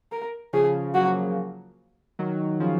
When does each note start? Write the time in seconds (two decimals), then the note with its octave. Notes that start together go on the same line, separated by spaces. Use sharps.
0.12 A#4
0.53 C#3 F3 G#4
0.94 F#3 A#3 F#4
2.19 D#3 F#3
2.60 C#3 F3